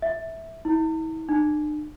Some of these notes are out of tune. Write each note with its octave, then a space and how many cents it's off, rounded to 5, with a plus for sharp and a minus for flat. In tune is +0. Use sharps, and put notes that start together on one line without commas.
E5 -10
E4 -45
D4 +45